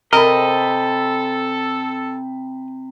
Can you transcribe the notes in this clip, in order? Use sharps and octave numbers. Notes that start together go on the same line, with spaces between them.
C3 A4 A#4 D#5 B5